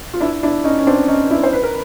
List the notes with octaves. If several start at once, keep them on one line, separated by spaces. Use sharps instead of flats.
F4
D4 E4
D4 E4
C#4 D#4
C#4
C4 D4
C#4 D#4
D4 E4
C5
B4
A#4